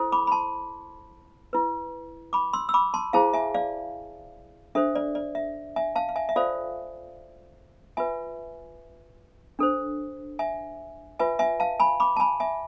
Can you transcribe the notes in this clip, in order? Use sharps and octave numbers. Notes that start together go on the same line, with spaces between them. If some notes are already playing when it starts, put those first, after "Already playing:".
Already playing: E4 A4 C5
B5 D6
B5
A5 C6
E4 B4
B5 D6
C6 E6
E6
B5 D6
A5 C6
E4 G#4 C5 F5 A5
E5 G#5
D5 F5
D4 A4 C5 E5
D5
D5
E5
E5 G#5
F5 A5
F5
E5 G#5
E5
F4 A4 C5 D5 F5
F4 B4 E5 G#5
D4 A4 C5
E5 G#5
F4 B4 E5 G#5
E5 G#5
F5 A5
G#5 B5
B5 D6
A5
G#5 B5
E5 G#5